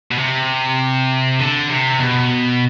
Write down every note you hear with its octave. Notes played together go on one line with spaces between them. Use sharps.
B2
C3
D3
C3
B2